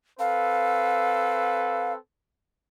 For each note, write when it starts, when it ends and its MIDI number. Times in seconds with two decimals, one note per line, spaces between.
0.19 1.97 60
0.19 1.97 69
0.19 1.97 71
0.19 1.93 77